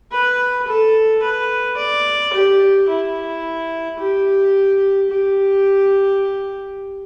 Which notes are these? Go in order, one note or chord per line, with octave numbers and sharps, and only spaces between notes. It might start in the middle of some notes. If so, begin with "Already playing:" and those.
B4
A4
B4
D5
G4
E4
G4
G4